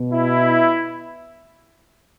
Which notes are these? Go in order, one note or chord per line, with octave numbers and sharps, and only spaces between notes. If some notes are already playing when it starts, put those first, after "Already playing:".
Already playing: B2
E4